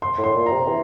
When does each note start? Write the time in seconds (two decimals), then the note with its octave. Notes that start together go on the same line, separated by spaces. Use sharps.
0.02 C6
0.18 A2
0.24 C6
0.35 A#2
0.46 A#5
0.52 C3
0.68 E3